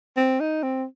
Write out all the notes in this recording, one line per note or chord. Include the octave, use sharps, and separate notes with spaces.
C4
D#4
C4